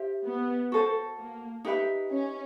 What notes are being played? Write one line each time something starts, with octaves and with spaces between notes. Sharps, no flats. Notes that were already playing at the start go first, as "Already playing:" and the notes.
Already playing: G4 C5 E5
B3
F#4 A4 C5
A#3
D#4 G4 B4 E5
C#4